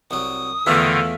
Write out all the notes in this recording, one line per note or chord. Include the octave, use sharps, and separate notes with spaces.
C2 F#3 D#6
E2 D3 D#3 A3 F4 E5 F5